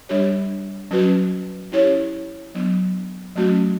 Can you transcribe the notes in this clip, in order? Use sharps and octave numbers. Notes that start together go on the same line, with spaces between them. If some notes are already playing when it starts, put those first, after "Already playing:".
G3 D4 G4 C#5
F#3 C#4 F#4 B4
C#4 E4 G4 C#5
F#3 B3 D4
F#3 A3 C#4 F#4